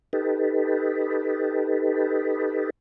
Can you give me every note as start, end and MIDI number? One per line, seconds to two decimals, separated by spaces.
0.13 2.70 63
0.13 2.70 67
0.13 2.70 69
0.13 2.70 71